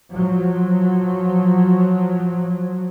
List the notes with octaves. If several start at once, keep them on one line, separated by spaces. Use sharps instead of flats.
F3 F#3